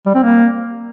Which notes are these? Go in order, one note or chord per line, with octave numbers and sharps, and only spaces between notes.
G3
C4
A#3